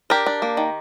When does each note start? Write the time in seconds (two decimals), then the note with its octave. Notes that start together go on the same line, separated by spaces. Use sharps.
0.10 D4 G4 A#4
0.26 D4
0.42 A#3
0.57 D#3